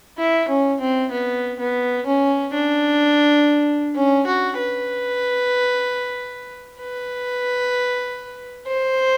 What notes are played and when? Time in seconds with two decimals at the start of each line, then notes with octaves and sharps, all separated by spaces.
0.18 E4
0.48 C#4
0.80 C4
1.12 B3
1.60 B3
2.06 C#4
2.54 D4
3.95 C#4
4.27 F#4
4.58 B4
6.79 B4
8.67 C5